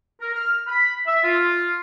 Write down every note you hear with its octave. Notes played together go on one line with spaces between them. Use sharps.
A#4
F6
B5
E5
F4